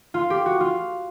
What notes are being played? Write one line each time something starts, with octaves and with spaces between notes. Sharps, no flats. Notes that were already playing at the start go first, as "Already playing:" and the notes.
F4
G4
F#4
F4